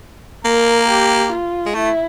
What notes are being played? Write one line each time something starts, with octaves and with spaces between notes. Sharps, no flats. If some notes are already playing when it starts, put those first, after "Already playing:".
A#3 A#4
G4
F4
G#3
A3 E4